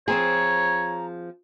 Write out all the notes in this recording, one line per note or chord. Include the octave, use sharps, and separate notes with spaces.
F3 C4 G#4 C#5 A#5